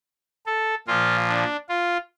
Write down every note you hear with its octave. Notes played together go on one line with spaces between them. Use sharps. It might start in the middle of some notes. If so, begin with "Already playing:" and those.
A4
A#2 F3 F4
D4
F4